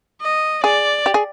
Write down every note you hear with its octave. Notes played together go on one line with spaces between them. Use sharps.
D#5
G#4 D5
G4
G#4